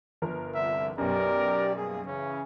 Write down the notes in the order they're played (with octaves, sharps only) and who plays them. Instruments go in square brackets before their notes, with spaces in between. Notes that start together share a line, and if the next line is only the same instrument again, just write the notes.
[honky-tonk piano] G1 F3 A#4
[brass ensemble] C2 D3 [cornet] E5
[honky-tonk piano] B1 F#2 [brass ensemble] G4 D5 [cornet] A#4
[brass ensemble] G3 A#3 G#4
[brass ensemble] C#3 E3 [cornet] C#4